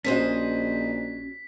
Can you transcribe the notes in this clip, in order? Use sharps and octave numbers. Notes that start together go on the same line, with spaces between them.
A#1 C#4 F#4 G#4 C5 D#5 B6